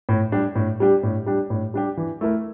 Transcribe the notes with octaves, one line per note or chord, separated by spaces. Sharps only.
A2
G3 D4 G4
A2
G3 D4 G4
A2
G3 D4 G4
A2
G3 D4 G4
E3
A3 E4 A#4